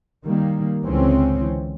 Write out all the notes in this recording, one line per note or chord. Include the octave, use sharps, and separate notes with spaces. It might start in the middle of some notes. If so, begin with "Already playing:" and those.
D#3 G3 A#3
C#2 D3 E3 G#3 C4 C#4